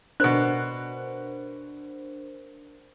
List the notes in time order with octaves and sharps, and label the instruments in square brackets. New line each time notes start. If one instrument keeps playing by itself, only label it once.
[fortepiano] B2 F#6 [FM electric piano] D4 A#4 C5